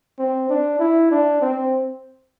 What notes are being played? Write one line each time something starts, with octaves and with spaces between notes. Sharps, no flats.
C4
D4
E4
D4
C4